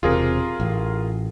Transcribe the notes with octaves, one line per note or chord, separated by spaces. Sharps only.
E1 C3 F4 G#4 A#4
A1